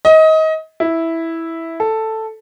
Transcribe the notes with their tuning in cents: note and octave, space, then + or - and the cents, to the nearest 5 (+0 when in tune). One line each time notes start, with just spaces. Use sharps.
D#5 +25
E4 -5
A4 +5